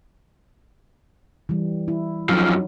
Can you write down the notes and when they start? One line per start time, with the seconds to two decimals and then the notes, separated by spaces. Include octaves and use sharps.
1.49 E3 G3
1.88 E4
2.29 F#2 F3 F#3 D#4